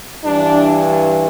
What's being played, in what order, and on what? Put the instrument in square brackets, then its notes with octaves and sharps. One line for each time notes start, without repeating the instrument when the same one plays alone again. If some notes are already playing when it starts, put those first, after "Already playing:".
[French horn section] G2 E3 D4